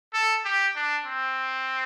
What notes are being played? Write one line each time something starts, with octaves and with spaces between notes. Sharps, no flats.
A4
G4
D4
C4